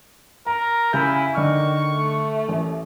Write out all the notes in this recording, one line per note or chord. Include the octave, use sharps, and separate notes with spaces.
A#4 A#5
C#3 E4 G4 G#5 G6
D3 D#3 D4 C#6 F6
A3
A1